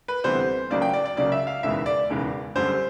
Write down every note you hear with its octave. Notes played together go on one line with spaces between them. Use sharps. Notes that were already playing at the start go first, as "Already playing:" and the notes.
B4
D2 C3 E3 G3 B3 C5
C#2 C#3 F#3 A#3 D5
G5
D5
D5
C#2 C#3 F#3 A#3 D5
E5
F5
E1 D#2 C#3 E3 G#3 E5
D5
E1 D#2 C#3 E3 G#3
F#2 D3 G3 C5